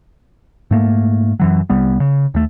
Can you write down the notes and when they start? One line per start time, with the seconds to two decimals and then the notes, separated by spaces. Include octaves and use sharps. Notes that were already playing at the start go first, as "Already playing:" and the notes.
0.71 G#2 A3 A#3
1.40 F#2 E3 F#3
1.70 C2 G3 B3
2.00 C#3
2.34 D#2 A3